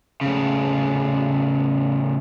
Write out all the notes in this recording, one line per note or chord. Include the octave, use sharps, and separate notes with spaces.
A2 C#3